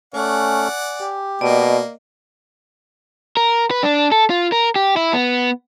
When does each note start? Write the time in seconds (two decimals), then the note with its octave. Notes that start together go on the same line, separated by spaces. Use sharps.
0.14 A3 C#4 D5 F#5 G#5
1.00 G4
1.41 B2 A#3 D5 D#5
3.37 A#4
3.71 B4
3.83 D4
4.12 A4
4.30 F4
4.52 A#4
4.76 G4
4.96 E4
5.13 B3